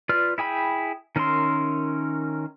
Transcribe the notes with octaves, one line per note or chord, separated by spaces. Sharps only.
F4 B4 D5 F6
E4 G#4 G5 B5
D#3 C#4 A#4 E5 C6